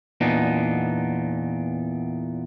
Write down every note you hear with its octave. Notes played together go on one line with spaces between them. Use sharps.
E2 A#2 B3 D4 D#4